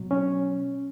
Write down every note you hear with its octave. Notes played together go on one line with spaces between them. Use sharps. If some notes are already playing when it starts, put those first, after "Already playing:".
Already playing: B2 F#3
C#4